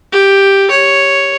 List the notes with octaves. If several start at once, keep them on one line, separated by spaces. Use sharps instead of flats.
G4
C#5